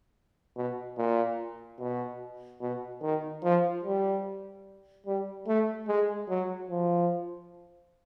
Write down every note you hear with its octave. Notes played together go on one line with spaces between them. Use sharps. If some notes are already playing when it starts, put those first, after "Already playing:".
B2
A#2
B2
B2
D#3
F3
G3
G3
A3
G#3
F#3
F3